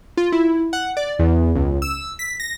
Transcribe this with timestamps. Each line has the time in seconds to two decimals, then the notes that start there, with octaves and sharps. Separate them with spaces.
0.17 F4
0.32 E4
0.73 F#5
0.97 D5
1.19 E2
1.55 C#2
1.82 E6
2.19 B6
2.40 A#6